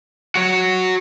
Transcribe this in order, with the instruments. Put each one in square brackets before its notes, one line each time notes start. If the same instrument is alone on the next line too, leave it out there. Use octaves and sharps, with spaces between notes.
[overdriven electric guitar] F#4 C#5